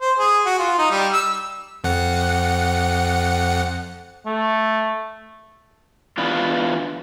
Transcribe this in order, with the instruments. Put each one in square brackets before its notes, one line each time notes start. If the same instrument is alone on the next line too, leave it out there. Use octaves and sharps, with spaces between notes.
[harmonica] C5
G#4
F#4
F4
D#4
G3
E6
[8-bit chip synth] F2 F#5
[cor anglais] A3
[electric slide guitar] E3 B3 D4 F4